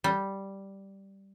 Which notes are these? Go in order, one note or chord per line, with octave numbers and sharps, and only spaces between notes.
G3